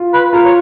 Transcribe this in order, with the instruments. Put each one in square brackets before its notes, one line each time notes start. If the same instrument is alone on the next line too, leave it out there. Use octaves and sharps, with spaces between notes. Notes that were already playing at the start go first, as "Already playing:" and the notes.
Already playing: [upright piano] F4
[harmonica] B4
[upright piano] F4 [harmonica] A#4
[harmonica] C#5